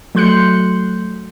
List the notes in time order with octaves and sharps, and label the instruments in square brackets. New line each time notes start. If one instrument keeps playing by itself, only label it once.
[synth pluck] F#3 A3 C6 F#6 G6 C#7